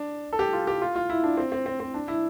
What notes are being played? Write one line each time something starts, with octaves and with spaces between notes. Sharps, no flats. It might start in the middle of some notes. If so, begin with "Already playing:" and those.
Already playing: D4
A4
G4
F4
G4
F4
F4
E4
D4
C4
C4
C4
C4
D4
E4